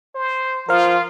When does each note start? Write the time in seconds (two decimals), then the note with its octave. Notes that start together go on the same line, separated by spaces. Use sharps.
0.15 C5
0.69 F3 F4 A#4 C5 F5